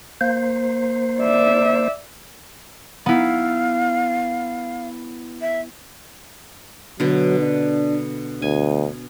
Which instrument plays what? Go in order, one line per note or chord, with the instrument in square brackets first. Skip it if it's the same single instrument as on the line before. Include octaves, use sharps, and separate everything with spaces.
[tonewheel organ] A#3 C5
[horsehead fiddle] D5 E5
[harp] B3 E4 [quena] F5
[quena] E5
[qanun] B2 D3 [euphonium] F#3
[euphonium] D4
[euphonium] D2 [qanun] G#5